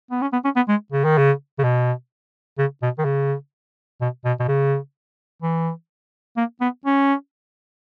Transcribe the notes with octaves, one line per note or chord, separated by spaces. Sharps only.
B3
C#4
B3
C#4
B3
G#3
C#3
D#3
C#3
C#3
B2
C#3
B2
D#3
C#3
B2
B2
B2
C#3
E3
A#3
B3
C#4